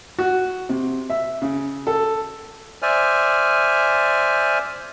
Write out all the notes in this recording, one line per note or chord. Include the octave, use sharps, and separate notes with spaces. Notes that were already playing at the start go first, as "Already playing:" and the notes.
F#4
C3
E5
C#3
A4
C5 D5 E5 G#5 F6